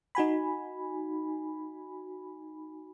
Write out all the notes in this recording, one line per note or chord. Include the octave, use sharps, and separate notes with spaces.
D#4 F#4 G#5 B5